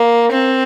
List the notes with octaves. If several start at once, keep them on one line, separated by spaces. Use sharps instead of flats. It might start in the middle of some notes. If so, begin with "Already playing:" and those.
Already playing: A#3
C4